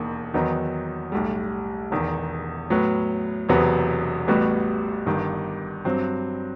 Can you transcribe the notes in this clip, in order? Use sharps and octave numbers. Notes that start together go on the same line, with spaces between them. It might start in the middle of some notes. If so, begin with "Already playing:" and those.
Already playing: E1 D#2 D#3
E2 D#3 F#3 B3 D#4
B1 A2 G3
E1 E2 D#3
A2 F#3 B3
E1 E2 C3 F#3 B3
A1 A2 G3 B3 F#4
G1 G2 D#3
G2 F#3 C4